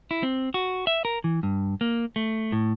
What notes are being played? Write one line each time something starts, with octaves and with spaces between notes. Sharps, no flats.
E4
C4
F#4
E5
A#4
E3
G2
A#3
A3
A2